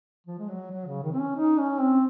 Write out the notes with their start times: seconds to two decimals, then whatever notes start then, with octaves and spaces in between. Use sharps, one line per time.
0.27 F3
0.39 G#3
0.49 F#3
0.71 F#3
0.87 C#3
1.03 D#3
1.12 C4
1.20 C#4
1.36 D#4
1.58 C#4
1.80 C4